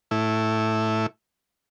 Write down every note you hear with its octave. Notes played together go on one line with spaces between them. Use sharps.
A2 E4